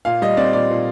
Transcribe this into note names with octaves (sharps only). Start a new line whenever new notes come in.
A#2 F5
G3 D#5
C4 D5
A#2 D5
A#2